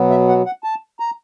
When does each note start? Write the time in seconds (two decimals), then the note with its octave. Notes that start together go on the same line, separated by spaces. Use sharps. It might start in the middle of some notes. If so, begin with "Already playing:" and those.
Already playing: B2 F#3 B3
0.10 E5
0.28 F#5
0.46 F#5
0.64 A5
1.00 A#5